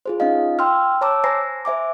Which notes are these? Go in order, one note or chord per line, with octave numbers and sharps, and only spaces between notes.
F4 G#4 C5
C#4 D#4 F4 D#5 F5
G5 C6 E6 F6
C#5 A5 A#5 D6 E6
C5 G#5 A#5 A#6 C7
C5 E5 G#5 D6